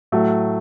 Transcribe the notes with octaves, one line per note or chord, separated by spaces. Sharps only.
A2 F#3 A3